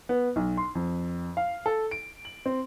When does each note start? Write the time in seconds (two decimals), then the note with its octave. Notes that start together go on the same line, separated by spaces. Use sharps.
0.09 B3
0.36 B1
0.57 C6
0.75 F2
1.37 F5
1.66 A4
1.91 D7
2.25 F#7
2.46 C4